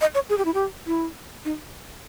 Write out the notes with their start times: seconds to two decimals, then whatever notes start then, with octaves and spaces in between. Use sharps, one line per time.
0.01 D#5
0.15 C#5
0.29 G#4
0.38 G4
0.45 E4
0.54 G4
0.87 E4
1.45 D#4